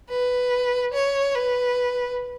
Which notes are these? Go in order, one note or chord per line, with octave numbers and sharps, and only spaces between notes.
B4
C#5
B4